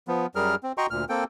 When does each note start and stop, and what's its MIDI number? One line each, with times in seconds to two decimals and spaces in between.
0.08 0.26 53
0.08 0.26 59
0.35 0.55 42
0.35 0.55 55
0.35 0.55 68
0.35 0.55 70
0.35 0.55 89
0.63 0.72 60
0.78 0.87 66
0.78 0.87 75
0.78 0.87 79
0.78 0.87 82
0.78 0.87 84
0.78 0.87 85
0.90 1.05 38
0.90 1.05 46
0.90 1.05 89
1.09 1.24 58
1.09 1.24 60
1.09 1.24 69
1.09 1.24 79